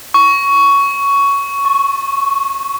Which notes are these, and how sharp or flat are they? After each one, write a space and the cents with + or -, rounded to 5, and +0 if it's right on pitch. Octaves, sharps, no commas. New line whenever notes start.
C#6 +10
C#6 -20